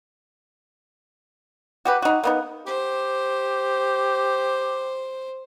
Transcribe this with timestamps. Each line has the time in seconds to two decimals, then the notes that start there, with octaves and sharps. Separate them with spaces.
1.85 F#4 G4 B4
2.02 D#4 F#4
2.23 A#3 B3 D#4
2.66 G4 C5